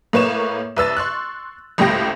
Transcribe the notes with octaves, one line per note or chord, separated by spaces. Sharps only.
A2 A#3 B4 C#5 E7
C2 B4 E6 A6
C6 C#6 F#6
G#1 C#2 A2 G4 G5 A#6